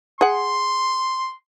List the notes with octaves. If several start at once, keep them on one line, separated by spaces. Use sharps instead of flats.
G#4 F#5 C6